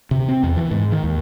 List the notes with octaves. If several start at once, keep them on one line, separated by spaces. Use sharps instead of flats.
C3
C4
E2
E3
G#2
D#3
D#2